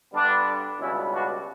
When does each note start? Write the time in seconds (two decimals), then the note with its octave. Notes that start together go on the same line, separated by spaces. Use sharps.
0.13 G2 D3 G3 B3 D4
0.79 C#2 B2 G3 B3 C#4 E4
1.12 D4 F#4